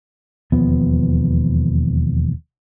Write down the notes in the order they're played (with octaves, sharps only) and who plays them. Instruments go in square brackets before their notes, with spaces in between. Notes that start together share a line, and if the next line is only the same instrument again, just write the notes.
[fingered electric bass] E1 D#2 F3 B3